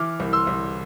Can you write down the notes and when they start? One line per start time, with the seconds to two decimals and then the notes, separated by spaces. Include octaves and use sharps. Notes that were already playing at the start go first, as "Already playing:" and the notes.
Already playing: E3 D6 F6
0.20 C2
0.33 C6 E6
0.47 C2